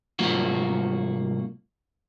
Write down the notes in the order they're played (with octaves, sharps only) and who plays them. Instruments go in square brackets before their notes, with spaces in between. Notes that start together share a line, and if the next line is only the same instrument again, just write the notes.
[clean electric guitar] C2 G#2 F#3 A#3 F4 F#4